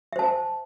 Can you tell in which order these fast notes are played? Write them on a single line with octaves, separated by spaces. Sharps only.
E5 C5 A5